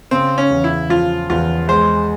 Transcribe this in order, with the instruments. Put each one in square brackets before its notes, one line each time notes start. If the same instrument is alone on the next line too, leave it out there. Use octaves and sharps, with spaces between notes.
[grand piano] C#3 [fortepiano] C4
[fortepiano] C#4
[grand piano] E2
[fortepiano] E4
[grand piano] F3 [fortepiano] F4
[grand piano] E2 [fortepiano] F4
[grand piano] G#3 [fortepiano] C5